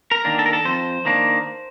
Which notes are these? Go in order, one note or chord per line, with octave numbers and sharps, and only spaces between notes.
A#4
D#3 A#3 D4
A4
A#4
A4
F2 C5
D#3 A#3 D4